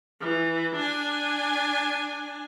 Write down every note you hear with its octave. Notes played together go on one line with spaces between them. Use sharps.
E3
D4 G#5